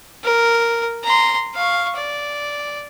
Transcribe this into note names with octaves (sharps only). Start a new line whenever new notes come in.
A#4
A#5 C6
F5 C#6
D5